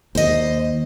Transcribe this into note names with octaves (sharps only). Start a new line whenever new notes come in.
D#2 C5 D#5